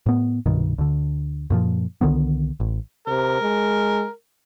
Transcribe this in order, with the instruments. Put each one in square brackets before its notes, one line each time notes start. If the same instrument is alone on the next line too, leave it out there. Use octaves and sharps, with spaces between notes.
[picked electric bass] A2 B3
C2 G2 B2 D#3
D2 D3
F#2 A#2 F3
C2 D3 D#3 B3
A1
[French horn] C3 [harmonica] A#4
[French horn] G#3